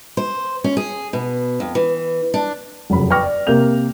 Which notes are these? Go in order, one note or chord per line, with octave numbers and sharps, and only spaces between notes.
C5
C#4
G#4
B2
F2
E3
D4
F1 F#2 C#3 B5
B4 G5 C#6 D6 F6 A#6
D5
C3 A#3 A#4 G6 F7